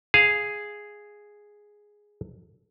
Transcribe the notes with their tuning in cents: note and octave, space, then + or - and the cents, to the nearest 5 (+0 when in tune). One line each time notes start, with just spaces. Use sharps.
G#4 +0 F5 +0